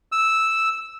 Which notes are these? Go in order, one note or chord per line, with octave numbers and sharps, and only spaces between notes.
E6